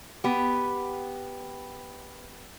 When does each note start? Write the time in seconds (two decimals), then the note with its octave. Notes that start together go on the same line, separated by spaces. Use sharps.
0.24 B3 G4